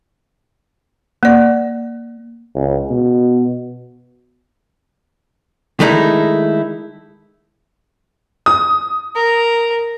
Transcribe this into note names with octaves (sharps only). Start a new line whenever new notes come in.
A#3 D5
C#2
B2
D#3 G#3 A3 D#4 E4
D#6
A#4